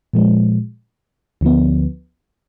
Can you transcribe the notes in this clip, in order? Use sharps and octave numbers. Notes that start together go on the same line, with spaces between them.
A#2 F3 G#3
D2 D3 F3 B3